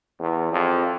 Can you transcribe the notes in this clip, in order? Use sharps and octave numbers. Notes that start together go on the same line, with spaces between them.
E2
F2